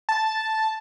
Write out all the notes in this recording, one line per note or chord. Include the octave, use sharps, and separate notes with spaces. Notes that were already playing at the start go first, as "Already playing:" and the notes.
A5